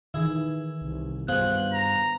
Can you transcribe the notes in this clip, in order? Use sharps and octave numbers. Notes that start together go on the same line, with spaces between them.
D#3 E3 E4 G#4
C2
G2 B3 F4 G#4 C5 F#6
A#5